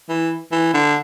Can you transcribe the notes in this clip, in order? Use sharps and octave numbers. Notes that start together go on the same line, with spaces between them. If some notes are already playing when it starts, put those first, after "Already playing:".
E3
E3
D3